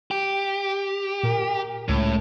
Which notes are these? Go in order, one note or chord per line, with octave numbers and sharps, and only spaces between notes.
G4
A#2 A#4
C#2 A2